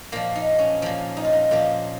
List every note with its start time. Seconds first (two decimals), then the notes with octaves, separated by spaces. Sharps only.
0.12 A#2 F3 A#3
0.35 D#4
0.59 C#4
0.82 A#2 F3
1.17 D#4
1.25 F4
1.33 D#4
1.51 A#2 F3 F4